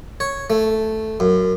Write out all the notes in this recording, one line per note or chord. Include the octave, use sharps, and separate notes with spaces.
C#5
A3
F#2